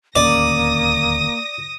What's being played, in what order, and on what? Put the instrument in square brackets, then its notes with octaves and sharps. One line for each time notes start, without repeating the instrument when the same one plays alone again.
[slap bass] D1 D#2 C#4 [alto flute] A#3 [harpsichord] D5 [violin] D#6 A#6